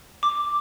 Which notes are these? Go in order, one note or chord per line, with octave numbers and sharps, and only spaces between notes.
D6